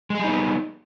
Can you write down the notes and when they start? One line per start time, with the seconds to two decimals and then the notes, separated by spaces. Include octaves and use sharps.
0.10 G#3
0.15 G#4
0.19 G3
0.24 D#4
0.29 B3